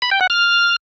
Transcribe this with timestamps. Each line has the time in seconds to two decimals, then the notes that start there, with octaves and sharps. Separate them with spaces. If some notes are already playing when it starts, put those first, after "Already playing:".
0.02 B5
0.11 G5
0.21 F#5
0.30 F6